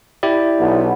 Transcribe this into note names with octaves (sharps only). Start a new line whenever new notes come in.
E4 G4 D5
B1 B3